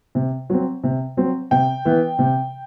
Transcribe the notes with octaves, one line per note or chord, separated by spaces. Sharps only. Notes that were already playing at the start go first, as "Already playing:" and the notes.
C3
F#3 C4
C3
F#3 C4
C3 G5
E3 B3
C3